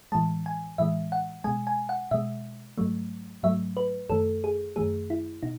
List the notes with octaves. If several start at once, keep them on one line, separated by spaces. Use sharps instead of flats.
A2 E3 G#3 A5
G#5
A2 E3 G#3 E5
F#5
B2 G#3 G#5
G#5
F#5
B2 G#3 E5
G#2 F#3 A3
G#2 F#3 A3 E5
B4
F#2 D#3 A3 A4
G#4
F#2 D#3 A3 G#4
E4
B2 D#4